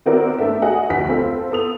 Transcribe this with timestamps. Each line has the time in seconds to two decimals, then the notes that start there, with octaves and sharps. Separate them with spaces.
0.06 D#3 B3 C4 F#4 A#4 D5
0.38 A3 B3 D4 A4 E5
0.62 F#4 G#4 D#5 F#5
0.90 F1 D2 F#4 B6
1.09 C4 F4 A4
1.51 B3 A4 D#6 F7